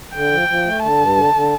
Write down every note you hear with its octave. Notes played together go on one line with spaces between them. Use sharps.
D3 G5
F3
F3
A3
D3 A5
G2
D3
D3